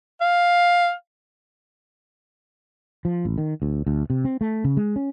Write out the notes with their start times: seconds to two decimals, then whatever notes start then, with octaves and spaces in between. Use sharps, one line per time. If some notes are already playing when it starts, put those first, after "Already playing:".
0.21 F5
3.05 F3
3.25 A1
3.38 D#3
3.62 D2
3.87 D2
4.10 C3
4.25 C4
4.41 A3
4.64 C#3
4.77 G#3
4.96 C#4